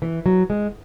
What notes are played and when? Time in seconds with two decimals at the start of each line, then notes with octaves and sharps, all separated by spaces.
0.02 E3
0.26 F#3
0.50 G#3